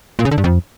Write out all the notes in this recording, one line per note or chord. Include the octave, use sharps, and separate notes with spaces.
A#2
C#3
D3
G2
F2